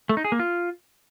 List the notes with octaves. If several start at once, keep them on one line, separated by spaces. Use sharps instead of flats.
A3
D#4
G#4
A#3
F4